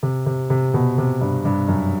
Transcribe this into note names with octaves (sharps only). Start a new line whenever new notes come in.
C3
C3
C3
B2
C3
G2
G2
F#2